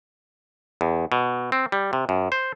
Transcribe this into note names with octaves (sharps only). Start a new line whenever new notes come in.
E2
B2
C4
G3
C3
F#2
C5